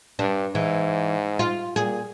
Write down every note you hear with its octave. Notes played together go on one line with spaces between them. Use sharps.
G2 D4
G#2 E3
F4
A#2 G#4